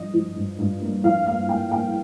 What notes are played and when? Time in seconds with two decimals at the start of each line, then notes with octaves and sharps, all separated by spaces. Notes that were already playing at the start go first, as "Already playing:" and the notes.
Already playing: G2 F3 D#5
0.14 F3
0.36 G2
0.59 G2
0.81 A#3
1.04 F3 F5
1.26 A#3 F5
1.49 A#3 G5
1.71 A#3 G5